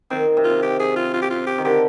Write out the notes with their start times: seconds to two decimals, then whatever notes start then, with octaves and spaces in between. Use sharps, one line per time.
0.10 D#3 C4
0.37 C3
0.44 F4
0.50 C3
0.62 G4
0.79 G#4
0.96 F4
1.14 F4
1.21 G4
1.30 F4
1.47 G4
1.58 D#3
1.65 D3 G4